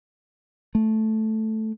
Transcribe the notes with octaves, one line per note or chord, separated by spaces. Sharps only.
A3